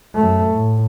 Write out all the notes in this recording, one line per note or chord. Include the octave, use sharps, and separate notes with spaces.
F#2 A3
A2